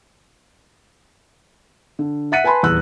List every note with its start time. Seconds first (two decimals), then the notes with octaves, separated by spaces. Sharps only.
1.99 D3
2.32 E5 F#5 F#6 B6 C#7 D#7
2.44 B4 G#5 A5 B5 C6
2.63 D#1 E2 E6 F#6